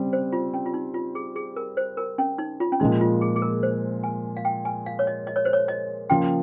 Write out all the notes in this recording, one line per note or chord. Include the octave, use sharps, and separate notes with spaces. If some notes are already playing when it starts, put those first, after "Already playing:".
Already playing: C#3 G3 C4
C5
F4
C#4
F4
D#4
F4
G#4
G#4
A#4
C5
A#4
C#4
D#4
F4
C#4
A#2 F3 G#3 D#4
F4
G#4
G#4
A#4
C5
G#5
F5
G5
G#5
F5
C#5
D#5
D#5
C#5
C5
C#5
D#5
C#3 F3 A#3 F4 G5